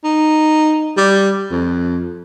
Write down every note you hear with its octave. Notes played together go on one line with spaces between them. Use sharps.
D#4
G3
F2